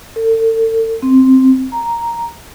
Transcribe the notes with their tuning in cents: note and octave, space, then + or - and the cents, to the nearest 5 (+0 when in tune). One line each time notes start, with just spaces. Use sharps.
A4 +40
C4 +0
A#5 +0